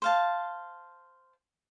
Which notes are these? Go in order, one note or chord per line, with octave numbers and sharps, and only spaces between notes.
C5 F5 A5